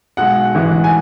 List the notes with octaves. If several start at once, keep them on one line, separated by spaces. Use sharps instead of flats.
B1 B2 G#3 F#5
A1 G#2 E3 G#3
G#5